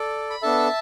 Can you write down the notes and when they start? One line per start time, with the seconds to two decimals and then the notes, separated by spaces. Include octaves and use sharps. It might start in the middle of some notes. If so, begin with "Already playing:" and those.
Already playing: A4 D5
0.30 B5
0.42 B3 D4 A4 E5 A5